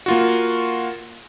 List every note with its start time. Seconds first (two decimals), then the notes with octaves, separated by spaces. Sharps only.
0.06 A#3 F4 F#4